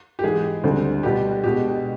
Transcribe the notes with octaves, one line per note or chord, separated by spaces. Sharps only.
G4
G#2 E3 G#3 G#4
D2 D3 G3 C4
B2 G3 B3 D4 G4
B2 G#3 B3 D4 G4